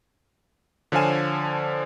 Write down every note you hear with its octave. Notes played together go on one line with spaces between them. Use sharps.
D3 F3 C#5 F5 G#5 E7